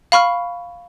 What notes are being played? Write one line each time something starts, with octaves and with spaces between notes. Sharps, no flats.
F5 B5 C#6 F6